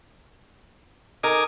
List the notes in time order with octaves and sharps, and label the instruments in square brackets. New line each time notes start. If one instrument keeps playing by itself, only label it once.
[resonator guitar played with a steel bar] D#4 A4 A#4 [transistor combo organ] G#5 D6 D#6